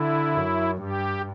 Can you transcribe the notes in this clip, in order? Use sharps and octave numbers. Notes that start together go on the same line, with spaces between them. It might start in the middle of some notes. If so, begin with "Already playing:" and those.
Already playing: D3 E4
F#2
G2 G4